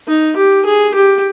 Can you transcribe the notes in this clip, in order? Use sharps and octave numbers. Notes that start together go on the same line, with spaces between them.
D#4
G4
G#4
G4